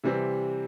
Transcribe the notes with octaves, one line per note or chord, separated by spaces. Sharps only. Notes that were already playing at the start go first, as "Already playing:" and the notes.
C3 E3 G3 C4